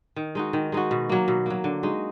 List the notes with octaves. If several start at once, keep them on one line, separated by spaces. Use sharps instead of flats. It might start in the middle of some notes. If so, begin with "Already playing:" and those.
D#3
G#3 D#4 F#4
D#3
G#3 D#4 F#4
B2
F#3 A#3
B2
F#3 A#3
D3
G#3 D#4 F#4